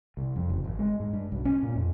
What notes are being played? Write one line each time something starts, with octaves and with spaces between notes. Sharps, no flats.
C2
F2
F#1
G#1
G#3
G#2
G2
B1
C#4
A#2
F2